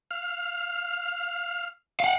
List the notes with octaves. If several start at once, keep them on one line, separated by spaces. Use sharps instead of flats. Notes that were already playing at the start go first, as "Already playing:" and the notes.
F5 F6
F5 F#5